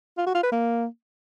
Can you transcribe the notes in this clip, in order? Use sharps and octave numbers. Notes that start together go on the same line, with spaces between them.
F4
F#4
F4
B4
A#3